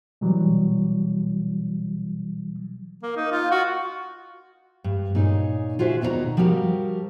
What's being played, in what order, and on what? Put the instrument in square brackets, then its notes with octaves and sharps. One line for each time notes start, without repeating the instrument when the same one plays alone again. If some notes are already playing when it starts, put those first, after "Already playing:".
[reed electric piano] B2 E3 F#3 G3
[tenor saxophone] A#3
D#4
F4
F#4
[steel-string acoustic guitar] G2
A#2 D#4 G#4 C#5
F4 F#4 G#4 C5 D#5 E5
D#2 B2 D#4 A4 D5 A#5
F3 G3 F#4 G4 A#4